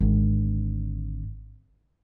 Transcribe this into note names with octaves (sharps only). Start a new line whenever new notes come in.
G#1 D3